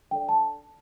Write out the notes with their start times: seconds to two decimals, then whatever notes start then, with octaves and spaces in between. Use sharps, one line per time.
0.11 D4 A4 D5 G5
0.29 A5